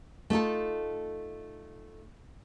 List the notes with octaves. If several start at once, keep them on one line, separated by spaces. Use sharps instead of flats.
A3 D#4 F4 A4